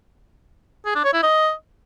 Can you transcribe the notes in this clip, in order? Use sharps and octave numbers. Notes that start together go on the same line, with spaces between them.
G#4
D4
C#5
E4
D#5